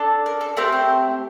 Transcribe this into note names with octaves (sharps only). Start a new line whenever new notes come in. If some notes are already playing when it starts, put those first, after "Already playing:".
Already playing: D4 A4
A#4
A4
A3 C4 G4 A#4
C5